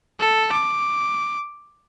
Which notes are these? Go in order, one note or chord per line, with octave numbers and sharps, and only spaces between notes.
A4
D6